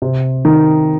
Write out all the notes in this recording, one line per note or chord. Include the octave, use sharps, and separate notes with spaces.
C3
D#3